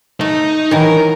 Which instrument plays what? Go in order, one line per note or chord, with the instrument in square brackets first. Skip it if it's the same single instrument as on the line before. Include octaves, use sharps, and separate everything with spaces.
[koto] A3 [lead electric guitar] D#4
[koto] D#3 E3 F#3 [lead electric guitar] A#4